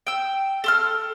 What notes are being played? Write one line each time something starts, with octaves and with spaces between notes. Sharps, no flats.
G5 E6
A4 C6 F6